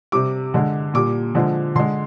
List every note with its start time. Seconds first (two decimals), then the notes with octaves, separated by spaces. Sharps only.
0.12 C3 G3 D6
0.54 D3 G#3
0.94 A#2 G3 D6
1.35 D3 F3 G#3
1.75 D3 G#3 C6